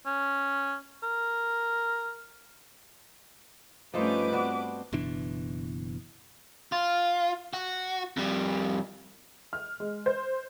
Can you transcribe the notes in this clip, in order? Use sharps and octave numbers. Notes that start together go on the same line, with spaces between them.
C#4
A#4
G2 F3 A3 C#4 D#4 B4 C5 D6
B3 C4 D4 F#4
F#1 B2 E3 D4
F4
F#4
F2 G3
F6
G#3
C5